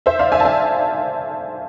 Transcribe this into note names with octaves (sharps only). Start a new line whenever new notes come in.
C5 E5
D5 F5
E5 G#5
A5
E5 G#5